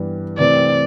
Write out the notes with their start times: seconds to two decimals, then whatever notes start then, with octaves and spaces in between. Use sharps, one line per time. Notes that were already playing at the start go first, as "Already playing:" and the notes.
Already playing: G2 E3 G3 B3
0.39 C3 E3 A3 C4 D5